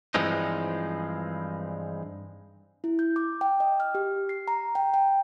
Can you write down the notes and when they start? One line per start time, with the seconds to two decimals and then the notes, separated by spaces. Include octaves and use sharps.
0.14 G2 E3 F3 G#3 C4 D#4
2.84 E4
2.99 G6
3.16 D6
3.41 G5
3.60 D#5
3.80 F6
3.95 G4
4.29 C7
4.48 A#5
4.75 G5
4.94 G5